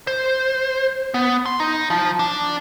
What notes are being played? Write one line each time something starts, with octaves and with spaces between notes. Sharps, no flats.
C5
B3
C6
D#4
F3
D4